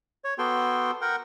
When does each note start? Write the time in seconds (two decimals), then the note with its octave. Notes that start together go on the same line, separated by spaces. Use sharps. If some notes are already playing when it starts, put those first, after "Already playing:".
0.25 C#5
0.38 B3 F#4 A4 G5 C6
1.01 A#4 F#5 G5